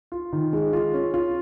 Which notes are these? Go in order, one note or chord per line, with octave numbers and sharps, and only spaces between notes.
F4
D#3
G#3
F4
C#4
F4